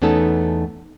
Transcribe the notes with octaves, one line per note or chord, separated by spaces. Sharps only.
E2 A3 B3 C#4 D#4 A4